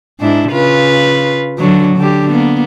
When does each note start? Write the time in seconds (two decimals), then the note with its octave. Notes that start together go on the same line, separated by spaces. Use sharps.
0.20 G#2 D4 E4
0.51 C#3 F4 B4
1.58 D3 F#3
1.97 D3 G4
2.30 A#3 B3